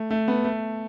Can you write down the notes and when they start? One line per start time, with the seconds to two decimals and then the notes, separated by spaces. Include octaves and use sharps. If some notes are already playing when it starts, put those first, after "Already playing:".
Already playing: A3
0.11 A3
0.28 B3
0.44 A3